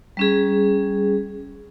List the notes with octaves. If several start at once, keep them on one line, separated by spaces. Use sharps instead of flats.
G3 C#4 G#4